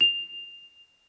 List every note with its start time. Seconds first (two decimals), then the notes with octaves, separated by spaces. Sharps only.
0.01 F7